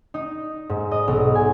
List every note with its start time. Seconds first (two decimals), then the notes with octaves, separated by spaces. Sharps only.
0.14 D#4
0.69 G#2
0.91 D#5
1.08 B1
1.35 G#5